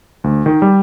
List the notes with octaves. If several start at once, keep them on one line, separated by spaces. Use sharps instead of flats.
D2
D#3
G3